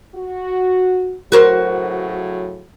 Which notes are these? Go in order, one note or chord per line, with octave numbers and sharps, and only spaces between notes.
F#4
A2 C#3 F#3 F#4 A#4 C5